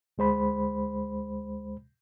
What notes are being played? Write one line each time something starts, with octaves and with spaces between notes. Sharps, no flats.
D2 G#3 C5 B5